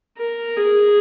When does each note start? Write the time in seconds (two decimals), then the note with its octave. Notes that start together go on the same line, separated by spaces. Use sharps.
0.18 A#4
0.57 G#4